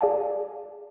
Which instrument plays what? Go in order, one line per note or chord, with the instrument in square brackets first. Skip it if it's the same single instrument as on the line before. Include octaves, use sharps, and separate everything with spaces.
[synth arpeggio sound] G#4 D5 F5 G#5 A5